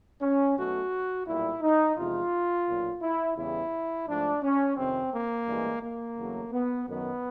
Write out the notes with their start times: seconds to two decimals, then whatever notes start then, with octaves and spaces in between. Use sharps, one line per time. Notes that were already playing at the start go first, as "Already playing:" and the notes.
0.22 C#4
0.58 B1 B2 F#3 A3 F#4
1.27 B1 A#2 G3 E4
1.62 D#4
1.97 E2 C3 F3 G#3 F4
2.68 B1 A#2 F#3
3.02 E4
3.37 E2 C#3 E3 G3 E4
4.08 G#2 F3 A3 D4
4.42 C#4
4.77 F2 C3 D#3 C4
5.12 A#3
5.47 A1 G2 E3 G#3
5.83 A#3
6.18 E2 C#3 F#3 A3
6.52 B3
6.88 F#2 D#3 F#3 B3